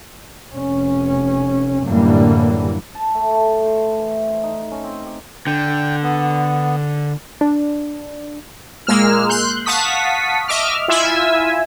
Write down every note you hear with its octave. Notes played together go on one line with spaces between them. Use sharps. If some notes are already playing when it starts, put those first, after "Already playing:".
F1 C#4
F#2 A2 D3 E3 G3 A#3
A5
A3
A3
A2
C5
E3
C5
D#4
C#4
C4
G4
D3 G5
B3
D4
A#2 G#3 A#3 E6 F6
C6 F#6 G6
F5 F#5 A5 C#6 D#6 B6
D#5 E5 D6 F6
E4 F4 E5 G#5 E6